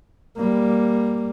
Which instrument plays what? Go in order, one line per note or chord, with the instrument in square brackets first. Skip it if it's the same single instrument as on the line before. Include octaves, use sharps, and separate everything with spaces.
[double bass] G3 A#3